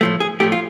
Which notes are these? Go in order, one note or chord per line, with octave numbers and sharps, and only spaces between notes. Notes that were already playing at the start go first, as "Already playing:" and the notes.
A2 F3 A3
G#4
A2 F3 A3 G4
F4